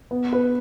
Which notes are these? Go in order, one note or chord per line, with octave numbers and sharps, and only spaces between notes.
B3
B4